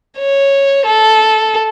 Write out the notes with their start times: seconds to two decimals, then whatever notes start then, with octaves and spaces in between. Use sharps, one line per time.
0.18 C#5
0.86 A4